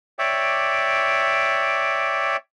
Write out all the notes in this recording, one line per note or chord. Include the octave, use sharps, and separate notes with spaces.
C#5 D5 E5 G5 D6